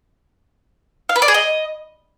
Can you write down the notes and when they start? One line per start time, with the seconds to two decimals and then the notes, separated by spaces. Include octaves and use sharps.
1.09 F5
1.16 B4
1.22 D5
1.28 G#4
1.34 D#5